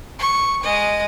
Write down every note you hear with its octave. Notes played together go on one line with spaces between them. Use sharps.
C#6
G#3 D#5